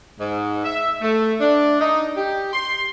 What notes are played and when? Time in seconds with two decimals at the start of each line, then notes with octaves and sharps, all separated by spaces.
0.19 G#2
0.64 E5
1.02 A3
1.40 D4
1.80 D#4
2.16 G4
2.53 C6